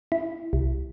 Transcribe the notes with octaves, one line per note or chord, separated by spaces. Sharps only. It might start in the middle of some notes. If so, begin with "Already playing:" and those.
E4
C2